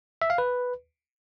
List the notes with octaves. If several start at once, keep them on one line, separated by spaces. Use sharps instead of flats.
E5
F5
B4